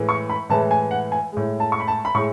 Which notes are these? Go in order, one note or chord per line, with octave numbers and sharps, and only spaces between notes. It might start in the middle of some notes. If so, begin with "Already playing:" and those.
Already playing: A2 E3 G#3
C#6
B5
A2 E3 G#3 A5
G#5
F#5
G#5
A2 G#3
A5
C#6
B5
A5
B5
A2 G#3 C#6